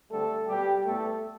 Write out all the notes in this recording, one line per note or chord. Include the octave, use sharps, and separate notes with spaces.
D3 G3 A3 C4 A4
B2 G3 B3 G4
A2 G3 A3 B3 A4